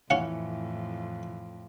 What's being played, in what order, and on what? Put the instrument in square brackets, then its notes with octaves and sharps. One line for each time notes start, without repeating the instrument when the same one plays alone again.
[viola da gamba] F2 A2 [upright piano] E3 [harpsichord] C#4 F5 F#5